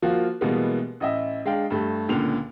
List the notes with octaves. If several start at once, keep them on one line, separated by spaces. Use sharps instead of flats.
F3 A#3 F4 F#4
B2 E3 G3 G#3 A#3 B3
A1 D#5 E5
G#3 D4 F5 G5
G2 A3
C#2 A#2 D3 F7